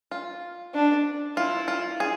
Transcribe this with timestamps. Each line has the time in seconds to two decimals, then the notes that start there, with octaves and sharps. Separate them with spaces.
0.11 F4
0.74 D4
1.37 E4 F4
1.68 F4
2.00 G#4